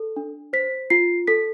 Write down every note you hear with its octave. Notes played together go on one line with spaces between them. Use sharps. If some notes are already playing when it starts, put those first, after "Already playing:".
Already playing: A4
D4
C5 B6
F4 C7
A4 B6